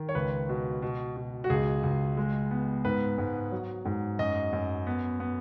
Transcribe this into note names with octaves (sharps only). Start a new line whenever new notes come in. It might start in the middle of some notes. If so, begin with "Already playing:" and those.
Already playing: D#3
C#5
C#2 B4
B2
B2
B2
F#4
C#2 G#4
C#2
G#3
B3
G#2 B4
G#2
F#3
G#2
F#2 D#5
F#2
B3
B3